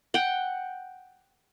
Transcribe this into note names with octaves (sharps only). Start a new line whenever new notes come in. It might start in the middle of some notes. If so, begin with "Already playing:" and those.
F#5 G5